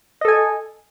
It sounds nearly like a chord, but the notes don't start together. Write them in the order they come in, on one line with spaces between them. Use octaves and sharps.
D#5 A4 G#5